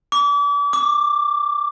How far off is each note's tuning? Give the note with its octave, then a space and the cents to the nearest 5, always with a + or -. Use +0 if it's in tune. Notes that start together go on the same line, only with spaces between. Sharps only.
D6 -35
D6 +10